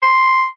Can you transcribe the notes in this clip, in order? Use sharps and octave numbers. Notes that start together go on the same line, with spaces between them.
C6